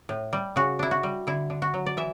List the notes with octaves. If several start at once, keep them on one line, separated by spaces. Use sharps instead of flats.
A2
G3
C#3 F#4
D4 E4
F#4
G3
D3 E4
D3
F#4
F#3
D5
E3 E5